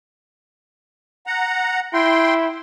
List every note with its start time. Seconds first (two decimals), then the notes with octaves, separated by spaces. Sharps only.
1.27 F#5 A#5
1.93 E4 G5 C6